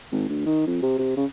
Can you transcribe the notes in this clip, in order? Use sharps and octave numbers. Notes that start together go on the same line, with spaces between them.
G#1
D2
D#3
F2
C3
C3
C#3